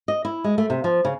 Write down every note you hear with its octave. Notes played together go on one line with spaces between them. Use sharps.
D#5
E4
G#3
A3
C3
F3
C#3